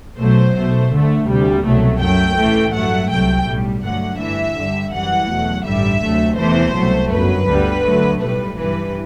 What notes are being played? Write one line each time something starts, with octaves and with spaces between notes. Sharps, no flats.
B1 B2 F#3 A3 C5
B1 B2 A3
D2 D3 A3
D2 C3 G3
C2 B2 F#3 A3
F#2 F#3 A3 G5
A1 A2 E3 A3
G2 F#3 A3 F#5
C2 C3 F#3 A3 G5
B1 A2 G3
G2 D3 F#3 A3 F#5
G2 E3 A3 E5
G2 D3 G3
F#2 E3 G3 F#5
E2 B2 F#3 A3
A1 G2 D3 G3 E5
D2 C3 F#3 A3
E2 C3 E3 A3 C5
C2 B2 F#3 A3
G1 F#2 F#3 B4
D2 D3 G3
D2 D3 F#3 A3
B1 A2 G3 B4
G2 E3 G3 B4